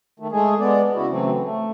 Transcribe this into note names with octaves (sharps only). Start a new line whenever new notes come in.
D#3 A3
G#3 A3 G#4
G#3 B3 D5
C#3 E4 F#4
C#3 E3 F#3 A3 C4
A3